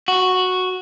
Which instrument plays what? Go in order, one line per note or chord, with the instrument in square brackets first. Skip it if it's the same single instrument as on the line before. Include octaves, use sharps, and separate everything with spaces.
[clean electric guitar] F#4